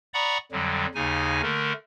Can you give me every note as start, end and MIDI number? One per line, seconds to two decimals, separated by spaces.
0.14 0.38 74
0.14 0.38 78
0.14 0.38 82
0.14 0.38 83
0.14 0.38 85
0.14 0.38 87
0.52 0.86 41
0.52 0.86 50
0.52 0.86 54
0.52 0.86 55
0.95 1.41 39
0.95 1.41 49
0.95 1.41 63
0.95 1.41 80
1.43 1.73 50
1.43 1.73 57
1.43 1.73 70